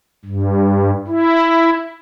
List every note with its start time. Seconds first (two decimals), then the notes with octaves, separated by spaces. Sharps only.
0.25 G2
1.07 E4